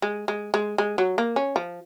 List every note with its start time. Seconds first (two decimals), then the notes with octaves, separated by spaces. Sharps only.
0.02 G#3
0.28 G#3
0.54 G#3
0.78 G#3
0.98 F#3
1.18 A#3
1.36 C#4
1.56 F3